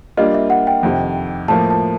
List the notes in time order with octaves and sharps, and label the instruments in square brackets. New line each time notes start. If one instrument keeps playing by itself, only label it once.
[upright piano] G3 A#3 D4 F4 [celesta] D#5
[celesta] E5
F#5
G5
[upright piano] F2 C3 D#3
[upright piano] A2 F3 A#3 [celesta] A5
[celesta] A5